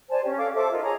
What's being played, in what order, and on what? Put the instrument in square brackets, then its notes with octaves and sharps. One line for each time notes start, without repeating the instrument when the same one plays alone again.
[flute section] C5 D5 G#5 A5
C#4 G4
A4 F5 D6
A4 C5 E5 D6
D#4 F4 A#4
G#4 C#5 A#5